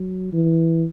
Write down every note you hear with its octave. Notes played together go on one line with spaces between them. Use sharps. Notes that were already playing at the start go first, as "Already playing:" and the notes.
Already playing: F#3
E3